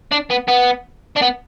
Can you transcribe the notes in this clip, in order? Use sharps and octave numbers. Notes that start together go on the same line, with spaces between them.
D4
B3
B3
D4
B3